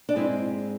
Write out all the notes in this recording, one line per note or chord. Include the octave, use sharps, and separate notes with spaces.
D4
G#2 G#3 C4 E4